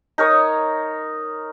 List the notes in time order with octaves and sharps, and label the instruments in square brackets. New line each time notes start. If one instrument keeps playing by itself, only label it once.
[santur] D#4 A#4 C#5 D#6